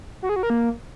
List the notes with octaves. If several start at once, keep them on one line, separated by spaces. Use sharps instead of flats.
F#4
G#4
F#4
A#4
A#3